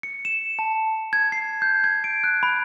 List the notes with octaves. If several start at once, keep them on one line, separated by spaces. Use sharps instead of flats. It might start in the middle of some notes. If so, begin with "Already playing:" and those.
C#7
E7
A5
G#6
C7
G6
G#6
D7
F#6
B5